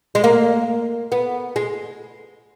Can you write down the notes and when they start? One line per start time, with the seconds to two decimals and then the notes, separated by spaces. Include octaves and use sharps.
0.15 G#3
0.24 A#3
1.12 B3
1.56 G#3